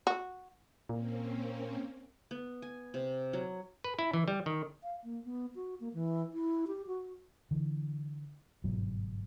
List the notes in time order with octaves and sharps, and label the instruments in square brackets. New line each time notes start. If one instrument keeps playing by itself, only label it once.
[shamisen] F#4
[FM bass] A#2 [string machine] A#3 C4 C#4
[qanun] B3
G#5
C3
F#3
[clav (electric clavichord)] B4
E4
E3
G3
D#3
[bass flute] F5
A#3
B3
F#4
A#3
E3
E4
G4
F#4
[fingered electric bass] D3 E3
G1 G#2 B2 F#3